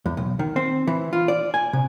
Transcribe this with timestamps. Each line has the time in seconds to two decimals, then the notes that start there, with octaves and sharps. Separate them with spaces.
0.06 E2
0.17 B1
0.39 D#3
0.56 C4
0.87 E3
1.13 F4
1.28 D5
1.54 G#5
1.73 C3